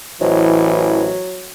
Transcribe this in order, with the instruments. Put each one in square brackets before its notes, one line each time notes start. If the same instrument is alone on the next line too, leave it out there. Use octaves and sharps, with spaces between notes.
[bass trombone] A1 [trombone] E3 [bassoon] F#3 [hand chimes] E4 C5 D#5